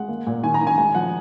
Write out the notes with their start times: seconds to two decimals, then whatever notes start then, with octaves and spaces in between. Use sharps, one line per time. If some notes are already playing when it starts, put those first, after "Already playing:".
Already playing: G#3 F#5
0.08 A#3
0.27 A#2
0.43 D#3 G#5
0.54 A#5
0.61 D#3
0.67 G#5
0.78 G#3 G#5
0.95 F3 F#5